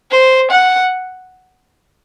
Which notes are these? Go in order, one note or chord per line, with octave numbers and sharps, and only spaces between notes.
C5
F#5